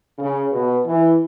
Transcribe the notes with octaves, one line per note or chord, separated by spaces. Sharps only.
C#3
B2
E3